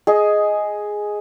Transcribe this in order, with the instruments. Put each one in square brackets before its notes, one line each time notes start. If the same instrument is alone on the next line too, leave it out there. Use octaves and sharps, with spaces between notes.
[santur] G#4 D#5